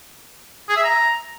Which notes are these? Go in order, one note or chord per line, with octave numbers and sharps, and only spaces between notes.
G#4
E5
A#5